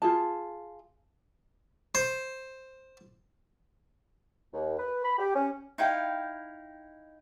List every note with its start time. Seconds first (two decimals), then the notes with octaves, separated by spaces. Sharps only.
0.02 F4 G#4 A5
1.95 C5
4.54 D#2
4.78 B4
5.04 B5
5.18 G4
5.35 C#4
5.78 D#4 E4 F5 G5